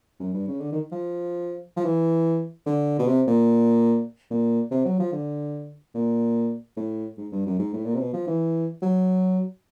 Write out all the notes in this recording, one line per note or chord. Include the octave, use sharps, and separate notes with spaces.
F#2
G2
C#3
D3
D#3
F3
F3
E3
D3
B2
C3
A#2
A#2
C3
F#3
F3
D3
A#2
A2
G#2
G2
F#2
G#2
A2
A#2
C3
B2
F3
E3
F#3